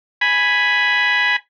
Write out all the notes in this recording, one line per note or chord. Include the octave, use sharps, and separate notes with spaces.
G#5 B5